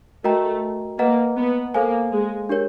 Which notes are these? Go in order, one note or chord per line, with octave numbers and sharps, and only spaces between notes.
A3 F#4 A#4 D#5 G5 A#5
A#3 B4 D#5 F#5 A#5
B3
A#3 A4 C5 F5 G#5
G#3
D4 G4 A#4 C#5